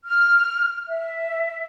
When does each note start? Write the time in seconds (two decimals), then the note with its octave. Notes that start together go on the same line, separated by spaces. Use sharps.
0.04 F6
0.88 E5